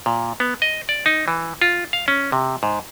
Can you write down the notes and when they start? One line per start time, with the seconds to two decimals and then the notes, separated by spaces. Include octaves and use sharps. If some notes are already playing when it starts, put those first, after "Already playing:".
0.06 A#2
0.40 B3
0.62 D#5
0.89 D5
1.06 D#4
1.28 E3
1.61 F4
1.93 F5
2.08 C#4
2.32 C3
2.63 G#2